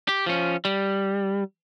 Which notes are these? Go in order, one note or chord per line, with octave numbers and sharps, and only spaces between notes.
G4
F3 C#4
G3